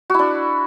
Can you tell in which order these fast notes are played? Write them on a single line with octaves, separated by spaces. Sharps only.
F#4 E4 D4